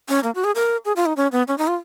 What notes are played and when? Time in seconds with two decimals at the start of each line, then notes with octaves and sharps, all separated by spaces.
0.09 C#4
0.23 A#3
0.35 F#4
0.44 G#4
0.55 A#4
0.85 G#4
0.96 F4
1.06 D#4
1.17 C#4
1.32 B3
1.48 C#4
1.58 D#4
1.67 F4